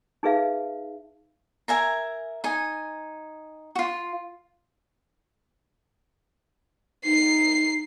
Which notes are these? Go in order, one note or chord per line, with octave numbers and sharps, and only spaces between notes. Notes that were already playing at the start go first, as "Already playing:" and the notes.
D#4 G#4 B4 E5 F5
A#4 E5 G#5 A#5
D#4 G#5
F4 F#4
D#4 C7